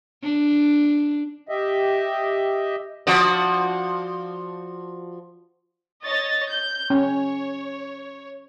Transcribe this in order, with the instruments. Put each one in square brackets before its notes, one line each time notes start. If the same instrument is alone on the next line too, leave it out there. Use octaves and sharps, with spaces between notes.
[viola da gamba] D4
[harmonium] G4 D#5 E5
[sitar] F3 F#4 D5
[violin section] C#5 D#5 A6
G6
[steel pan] C#4 [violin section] C#5